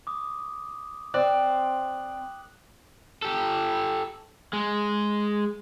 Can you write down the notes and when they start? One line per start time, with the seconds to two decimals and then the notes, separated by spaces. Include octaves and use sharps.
0.07 D6 D#6
1.14 C4 D5 F#6 F#7
3.22 G4 A4
4.53 G#3